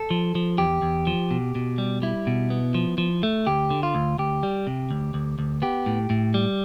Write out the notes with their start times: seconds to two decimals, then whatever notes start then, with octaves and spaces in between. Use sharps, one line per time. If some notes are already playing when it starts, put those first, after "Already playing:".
Already playing: A4
0.10 F3
0.35 F3
0.58 E2 G4
0.82 E2
1.07 F3
1.31 B2
1.55 B2
1.78 G3
2.02 G3 E4
2.27 B2
2.50 B3
2.74 F3
2.98 F3
3.23 A3
3.47 D2 G4
3.70 D3
3.83 F4
3.95 D2
4.18 D2 G4
4.43 G3
4.67 C3
4.91 D2
5.14 D2
5.39 D2
5.62 B3 G4
5.86 A2
6.10 A2
6.34 G3